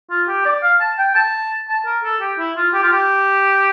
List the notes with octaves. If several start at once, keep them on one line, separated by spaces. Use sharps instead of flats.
F4
G4
D5
F5
A5
G5
A5
A5
A#4
A4
G4
E4
F4
G4
F4
G4